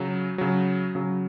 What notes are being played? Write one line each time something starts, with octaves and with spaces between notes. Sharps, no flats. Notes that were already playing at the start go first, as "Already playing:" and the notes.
Already playing: C#3 F#3
C#3 F#3
C#3 F#3